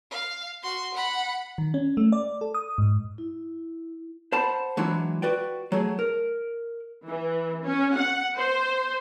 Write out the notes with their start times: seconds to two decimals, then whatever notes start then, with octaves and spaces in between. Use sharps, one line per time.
0.11 F5
0.63 F#4 C6
0.94 F#5 B5
1.58 D#3
1.74 C#4
1.97 A3
2.12 D5
2.41 A4
2.54 D#6
2.78 G#2
3.18 E4
4.32 C5 F#5 A5 B5
4.77 E3 F#3 G#3 D4 E4 F#4
5.22 F#4 B4 D5 G5
5.72 F#3 A3 G#4
5.99 A#4
7.08 E3
7.65 C#4
7.95 F#5
8.37 C5